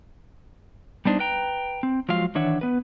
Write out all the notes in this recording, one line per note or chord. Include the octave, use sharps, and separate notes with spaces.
G3 B3 D4 D#4 C5
B4 G5 A#5
C4
F3 F#3 G#3 F4 F5
D#3 E3 D4 C#5 E5 F#5
B3 B4